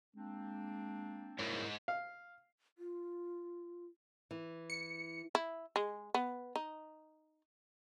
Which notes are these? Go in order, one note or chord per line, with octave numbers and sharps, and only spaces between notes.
G#3 A#3 C4 D4
G#2 E4 A#4 C#5
F5
F4
E3
C#7
E4
G#3
B3
D#4